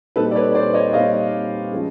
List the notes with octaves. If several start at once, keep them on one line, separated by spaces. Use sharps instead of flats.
A#2 G3 C4 D#4 A4 B4
D5
B4 C#5
C5 D5
C#5 D#5
A#2 G3 C4 D#4 D#5 F5
F3 G#3 C#4